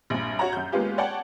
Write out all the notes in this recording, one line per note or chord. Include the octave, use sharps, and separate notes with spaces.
A#1 G2
F#4 C#5 F#5 A#5
F#2 G6
G#3 A#3 B3 C#4 F4 G4
C#5 D5 F#5 G5 A5